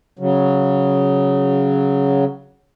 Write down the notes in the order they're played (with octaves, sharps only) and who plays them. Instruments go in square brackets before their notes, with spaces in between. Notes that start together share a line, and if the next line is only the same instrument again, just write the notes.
[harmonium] C#3 F#3